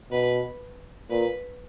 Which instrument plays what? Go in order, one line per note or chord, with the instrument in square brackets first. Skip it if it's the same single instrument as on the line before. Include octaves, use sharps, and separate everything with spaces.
[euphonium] B2 [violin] B4
[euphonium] A#2 [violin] B4